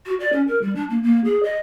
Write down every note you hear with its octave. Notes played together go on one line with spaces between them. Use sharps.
F#4
D5
C#4
A#4
G3
D4
A#3
A#3
G#4
D#5